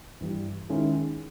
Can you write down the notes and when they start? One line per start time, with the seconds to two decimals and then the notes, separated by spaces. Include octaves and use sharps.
0.21 G2 E3 G3
0.69 D#3 G#3 C#4 E4